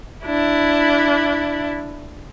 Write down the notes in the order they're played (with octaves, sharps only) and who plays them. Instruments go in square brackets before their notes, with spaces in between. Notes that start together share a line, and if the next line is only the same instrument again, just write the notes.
[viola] D4 E4